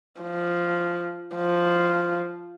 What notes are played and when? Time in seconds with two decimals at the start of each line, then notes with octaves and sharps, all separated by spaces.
0.21 F3
1.36 F3